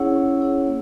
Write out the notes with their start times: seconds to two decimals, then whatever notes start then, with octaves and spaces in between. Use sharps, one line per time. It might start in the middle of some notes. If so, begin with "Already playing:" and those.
Already playing: C#4 E4 G#4 C#5 F#5
0.16 C#4
0.41 E4 G#4 C#5 F#5
0.66 A#3